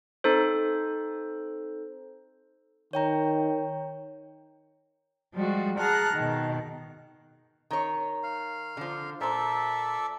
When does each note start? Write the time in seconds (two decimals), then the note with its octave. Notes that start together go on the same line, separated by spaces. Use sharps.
0.24 C4 D#4 A4 C5
2.93 D#3 C#5 G5 A#5
5.34 F3 G3 G#3 F#4
5.79 G#4 F#5 A5 A#5 F6 F#6
6.14 B2 D#3
7.71 D#3 C#5
8.23 F5
8.77 D3 F3
9.21 A#2 A4 C5 D5 E5